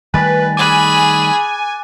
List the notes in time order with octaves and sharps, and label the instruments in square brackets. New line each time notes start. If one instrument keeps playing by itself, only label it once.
[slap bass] D#3 G3 A3 [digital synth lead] B4 [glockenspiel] G#5 A6
[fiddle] G#4 B5 [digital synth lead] G#5 [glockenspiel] D6 F#6